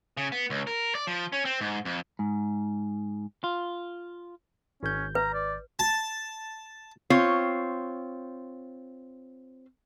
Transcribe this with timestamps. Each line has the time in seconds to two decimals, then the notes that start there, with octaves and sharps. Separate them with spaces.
0.17 C#3
0.32 B3
0.50 C#2
0.67 A#4
0.95 D5
1.07 F3
1.32 C#4
1.45 C4
1.61 G#2
1.85 F2
2.19 G#2
3.44 F4
4.83 G#1 C#4 G6
5.15 B4 A#5
5.34 D5
5.79 A5
7.10 C4 F4 C#5